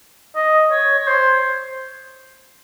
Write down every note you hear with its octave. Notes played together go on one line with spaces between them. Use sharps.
D#5
C#5
C#5
C5